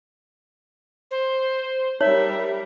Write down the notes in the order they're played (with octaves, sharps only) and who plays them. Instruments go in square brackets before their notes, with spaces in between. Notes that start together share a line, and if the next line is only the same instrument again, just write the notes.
[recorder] C5
[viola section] G3 A#4 [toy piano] D#4 C#5 [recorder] E5